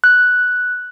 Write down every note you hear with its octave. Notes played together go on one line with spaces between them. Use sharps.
F#6